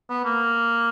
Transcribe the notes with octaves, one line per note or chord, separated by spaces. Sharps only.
B3
A#3